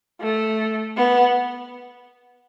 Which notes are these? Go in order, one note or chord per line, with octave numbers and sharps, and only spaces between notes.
A3
B3